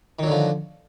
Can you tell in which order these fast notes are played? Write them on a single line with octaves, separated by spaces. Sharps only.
D#3 F#3 D3 F3